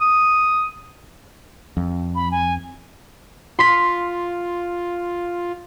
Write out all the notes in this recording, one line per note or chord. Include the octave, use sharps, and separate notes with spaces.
D#6
F2
B5
G#5
F4 C6 B6